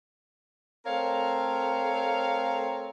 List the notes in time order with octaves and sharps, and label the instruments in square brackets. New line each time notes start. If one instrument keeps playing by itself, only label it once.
[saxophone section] A3 C4 A#4 C#5 F5